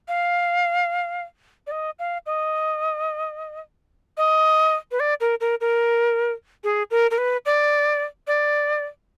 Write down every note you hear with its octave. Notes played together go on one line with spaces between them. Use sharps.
F5
D5
D#5
F5
D#5
D#5
B4
D5
A#4
A#4
A#4
G#4
A#4
A#4
B4
D5
D5